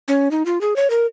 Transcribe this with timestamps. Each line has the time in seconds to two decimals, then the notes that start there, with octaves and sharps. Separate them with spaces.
0.08 C#4
0.31 D#4
0.46 F4
0.61 G#4
0.76 C#5
0.90 A#4